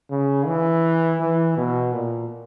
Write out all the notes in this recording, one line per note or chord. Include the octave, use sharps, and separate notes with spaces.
C#3
E3
E3
B2
A#2